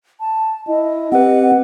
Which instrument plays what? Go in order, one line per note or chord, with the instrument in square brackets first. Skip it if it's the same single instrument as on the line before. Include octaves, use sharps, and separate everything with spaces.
[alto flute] A5
[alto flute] E4 [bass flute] D#5
[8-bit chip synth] C4 B4 [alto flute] G4 [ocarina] F#5